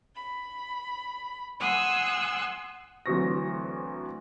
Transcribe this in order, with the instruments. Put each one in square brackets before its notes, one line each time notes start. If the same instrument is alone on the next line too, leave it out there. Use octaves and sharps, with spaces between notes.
[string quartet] B5
F#5 G#5 C6 D#6 E6 F#6
[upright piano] D2 E3 F#3 C4 C#6 A#6